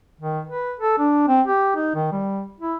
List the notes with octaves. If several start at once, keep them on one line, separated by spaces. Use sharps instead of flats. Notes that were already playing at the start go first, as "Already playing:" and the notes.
D#3
B4
A4
D4
C4
G4
D#4
D#3
G3
E4